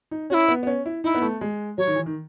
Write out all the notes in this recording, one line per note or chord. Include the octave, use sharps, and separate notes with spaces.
D#4
C#4 E4 F#4
B3
B3
C#4
E4
D#4 E4
B3
A3
G#3
F#3 C#5
D#3
E3
D#3